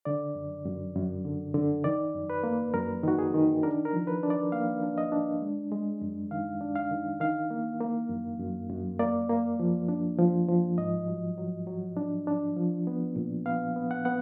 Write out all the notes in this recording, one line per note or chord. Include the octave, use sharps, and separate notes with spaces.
D3 D5
F#2
F#2
F#2
D3
D3
D#3 D5
F#2
B4
A#3
F#2 A#4
D#3 F#4
G#4
D#3
D4 A#4
A#4
F3
B4
D4
D5
A#3 F5
D4
D#5
D4
G#3
G#3
F#2
D#3 F5
D4
F5
D#3
D#3 F5
A#3
A#3
F#2
F#2
F#2
A#3 D5
A#3
F3
D4
F3
F3
G#2 D#5
F#3
F#3
F#3
D4
D4
F3
B3
A#2
B3 F5
B3
F#5
B3 F#5